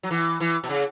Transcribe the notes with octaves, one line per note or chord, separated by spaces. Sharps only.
F#3
E3
E3
B2
C#3